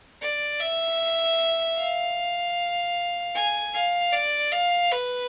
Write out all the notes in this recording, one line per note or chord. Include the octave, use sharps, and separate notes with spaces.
D5
E5
F5
G#5
F5
D5
F5
B4